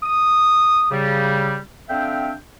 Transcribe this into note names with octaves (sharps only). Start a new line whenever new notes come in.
D#6
C#3 G3
D3 C4 D4 E5 F5 G5